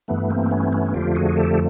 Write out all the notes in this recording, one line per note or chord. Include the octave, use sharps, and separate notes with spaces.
G2 E3 A3 B3
A#3 C4
B3 C#4
C4
B3 C#4
F2 D3 F3 A3 F4 G4
F#4 G#4
G4 A4